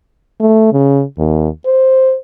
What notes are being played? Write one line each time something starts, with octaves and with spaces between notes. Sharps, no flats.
A3
C#3
D#2
C5